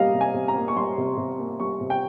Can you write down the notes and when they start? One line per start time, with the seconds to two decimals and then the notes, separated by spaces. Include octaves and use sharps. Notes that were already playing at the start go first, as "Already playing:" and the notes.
Already playing: C3 G3 A#3 D#5 F5
0.14 C3
0.21 G#5
0.34 C3
0.48 A#5
0.56 A#3
0.68 C#6
0.76 G3 C6
0.98 C3
1.17 C3
1.39 A#3
1.60 G3 C#6
1.81 C3
1.90 G5